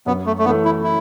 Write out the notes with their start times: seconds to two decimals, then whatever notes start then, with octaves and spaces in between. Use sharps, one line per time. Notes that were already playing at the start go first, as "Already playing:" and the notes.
0.06 F#2 B3
0.26 A3
0.38 A3
0.45 E3 B3
0.49 A3
0.65 E4
0.83 E4